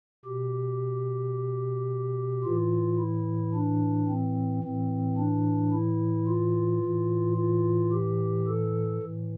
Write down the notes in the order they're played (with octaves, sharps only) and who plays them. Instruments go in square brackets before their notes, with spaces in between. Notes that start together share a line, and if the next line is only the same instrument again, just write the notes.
[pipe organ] B2 G4
A2 E3 F4
E4
D4
C4
A2 E3 C4
D4
E4
F4
A2 E3
F4
G4
A4
A2 E3